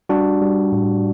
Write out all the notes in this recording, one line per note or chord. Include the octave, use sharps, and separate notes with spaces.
G3 D4 F#4
G3
A2